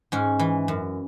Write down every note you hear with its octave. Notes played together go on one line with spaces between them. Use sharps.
G#2 C#4
E3
F#2